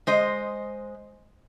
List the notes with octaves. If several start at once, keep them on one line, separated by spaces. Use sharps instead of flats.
G#3 C5 D#5